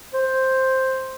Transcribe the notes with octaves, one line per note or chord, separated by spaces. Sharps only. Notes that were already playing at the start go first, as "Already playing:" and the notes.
C5